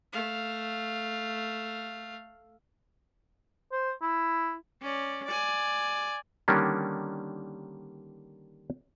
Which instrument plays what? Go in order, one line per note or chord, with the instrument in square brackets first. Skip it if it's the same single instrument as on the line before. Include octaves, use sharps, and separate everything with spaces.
[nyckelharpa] A3 F5
[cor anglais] C5
E4
[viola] C#4 D5
D5 G#5
[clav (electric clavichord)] D3 D#3 G3 A#3 C#4 D4